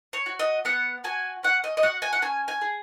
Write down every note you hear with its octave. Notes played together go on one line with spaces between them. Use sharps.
C#5
F#4
D#5
B3 F#5
F#4 G#5
C#4 F#5
D#5
D#5
F#4 F#5
G#5
F#5
C#4 G#5
G#5
G#4